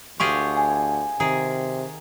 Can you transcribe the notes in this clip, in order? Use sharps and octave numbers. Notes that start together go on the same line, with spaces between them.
D2 F4 G4 G#4 C#6
G#5
C3 D#3 G#4